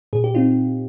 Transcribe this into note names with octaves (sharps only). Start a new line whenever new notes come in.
A#2 G#4
G4
C4 D#4 F4